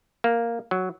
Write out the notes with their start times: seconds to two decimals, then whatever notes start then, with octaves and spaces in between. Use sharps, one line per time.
0.24 A#3
0.71 F#3